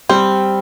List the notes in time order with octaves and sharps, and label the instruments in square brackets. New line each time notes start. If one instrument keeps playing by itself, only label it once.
[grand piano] G3 [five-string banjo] C4